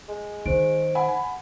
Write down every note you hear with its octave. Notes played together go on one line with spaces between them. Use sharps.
G#3
D#3 C5 D7
F#5 G#5 B5